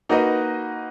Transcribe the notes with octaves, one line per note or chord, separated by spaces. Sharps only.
A#3 D#4 F#4 B4 D#5